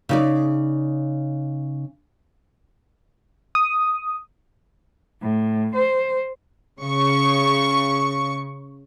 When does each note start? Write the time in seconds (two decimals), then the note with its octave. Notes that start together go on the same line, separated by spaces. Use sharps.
0.09 C#3 D#4 D5
3.55 D#6
5.22 A2
5.75 C5
6.82 C#3 C#6